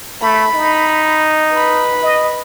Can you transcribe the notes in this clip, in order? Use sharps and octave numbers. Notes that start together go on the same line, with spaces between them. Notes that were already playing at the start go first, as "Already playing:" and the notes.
A3 B5
D#4
B4 B5
D#5